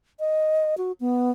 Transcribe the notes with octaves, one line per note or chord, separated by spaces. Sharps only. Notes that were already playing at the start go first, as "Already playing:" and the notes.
D#5
F#4
B3